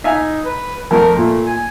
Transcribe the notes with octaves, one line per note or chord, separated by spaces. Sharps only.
D#4 E5 F5 G#5
B4
F2 A3 A#4
A#2 A3
G#5